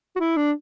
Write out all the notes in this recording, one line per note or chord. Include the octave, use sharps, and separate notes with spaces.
F#4
E4
D4